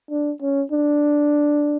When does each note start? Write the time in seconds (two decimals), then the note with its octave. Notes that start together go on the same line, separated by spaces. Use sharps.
0.11 D4
0.42 C#4
0.72 D4